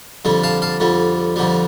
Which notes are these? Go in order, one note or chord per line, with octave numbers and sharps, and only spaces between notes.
F2 D3 G3
F5 A5
F5 A5
F2 D3 G3
F2 D3 G3